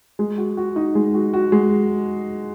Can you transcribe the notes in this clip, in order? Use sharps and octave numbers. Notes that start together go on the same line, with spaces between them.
G#3
F#4
F#4
D#4
G#3
F#4
F#4
G#3